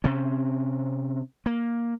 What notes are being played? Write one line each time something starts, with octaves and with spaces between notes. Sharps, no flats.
C3 C4 C#4
A#3